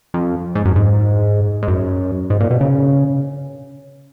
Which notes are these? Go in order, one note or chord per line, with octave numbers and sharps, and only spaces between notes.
F2
G#2
F#2
G#2
G#2
F#2
G#2
A#2
B2
C#3